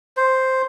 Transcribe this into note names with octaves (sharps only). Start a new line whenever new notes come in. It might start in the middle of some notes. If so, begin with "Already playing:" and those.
C5